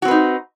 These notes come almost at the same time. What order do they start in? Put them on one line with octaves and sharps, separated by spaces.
F#4 C4 B4 D#4